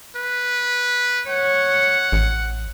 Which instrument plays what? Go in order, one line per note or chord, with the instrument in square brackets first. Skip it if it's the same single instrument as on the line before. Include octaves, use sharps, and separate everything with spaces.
[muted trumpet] B4
[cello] C#5 [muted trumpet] F#5
[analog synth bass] A1